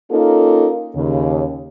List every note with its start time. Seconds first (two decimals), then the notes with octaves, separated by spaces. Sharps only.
0.11 A#3 C#4 D#4 F4 A4 A#4
0.95 D#2 C#3